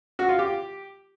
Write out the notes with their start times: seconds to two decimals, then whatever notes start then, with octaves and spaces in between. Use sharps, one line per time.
0.19 F#4
0.29 F4
0.39 G4